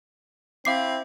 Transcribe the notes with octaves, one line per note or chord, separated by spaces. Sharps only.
C4 E4 F5 D6 C7